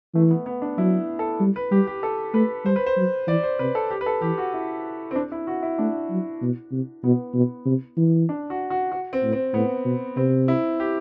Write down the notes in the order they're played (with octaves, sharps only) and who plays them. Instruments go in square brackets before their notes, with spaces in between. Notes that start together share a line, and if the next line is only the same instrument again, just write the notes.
[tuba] E3 [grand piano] A3
[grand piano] B3
B3
D4
[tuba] F#3 [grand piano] E4
[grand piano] A4
[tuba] G3
[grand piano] B4
[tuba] G3 [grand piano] G4
[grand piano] G4
A4
[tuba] A3 [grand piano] B4
[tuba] G3 [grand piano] C5
[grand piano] B4
C5
[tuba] F#3
[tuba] E3 [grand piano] D5
[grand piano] C5
[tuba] C3 [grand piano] B4
[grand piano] A4
G4
B4
A4
[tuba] E3 [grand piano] G4
[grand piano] F#4
E4
C4
D4
E4
F#4
E4
[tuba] A3 [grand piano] D4
[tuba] F#3
B2
C3
[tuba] B2 [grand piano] B3
[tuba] B2
C3
E3
[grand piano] D4
F#4
F#4
F#4
C4
[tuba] A2
[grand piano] C4
[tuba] A2 [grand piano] B3
[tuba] B2
[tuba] C3 [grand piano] C4
[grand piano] E4
G4